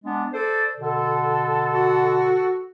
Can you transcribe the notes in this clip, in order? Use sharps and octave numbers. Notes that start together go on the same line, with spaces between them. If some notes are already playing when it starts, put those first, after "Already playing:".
G#3 B3 D4
A4 C5 D5
B2 D3 A4
F#4